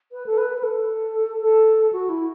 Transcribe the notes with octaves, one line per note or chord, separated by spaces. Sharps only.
B4
A4
B4
B4
A4
A4
F#4
E4